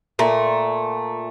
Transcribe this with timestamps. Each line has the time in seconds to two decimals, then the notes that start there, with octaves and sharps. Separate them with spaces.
0.19 A#2 A3